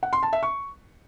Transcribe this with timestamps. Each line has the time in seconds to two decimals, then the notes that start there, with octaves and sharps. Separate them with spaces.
0.03 F#5
0.13 C6
0.23 A5
0.33 E5
0.43 C#6